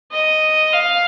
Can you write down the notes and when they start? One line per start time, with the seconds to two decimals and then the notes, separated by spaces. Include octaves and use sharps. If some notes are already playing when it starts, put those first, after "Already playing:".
0.12 D#5
0.73 F5